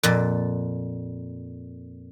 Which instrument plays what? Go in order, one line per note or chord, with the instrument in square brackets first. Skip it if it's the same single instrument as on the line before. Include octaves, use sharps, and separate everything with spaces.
[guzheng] F2 A#2